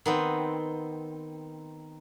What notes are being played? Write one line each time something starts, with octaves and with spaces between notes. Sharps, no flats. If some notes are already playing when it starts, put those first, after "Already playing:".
D#3 B3 C4